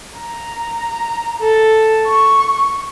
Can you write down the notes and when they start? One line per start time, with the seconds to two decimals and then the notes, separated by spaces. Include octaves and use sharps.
0.19 A#5
1.39 A4
2.07 C#6